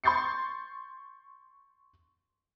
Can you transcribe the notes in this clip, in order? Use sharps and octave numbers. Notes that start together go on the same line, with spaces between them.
C6 C#6 G6 A6 C7 C#7